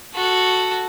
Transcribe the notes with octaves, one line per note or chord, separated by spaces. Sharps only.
F#4 A4